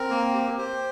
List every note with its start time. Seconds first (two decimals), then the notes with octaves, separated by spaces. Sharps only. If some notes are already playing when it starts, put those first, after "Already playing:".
Already playing: C4 A#4
0.10 A#3
0.34 G4
0.58 G4 C5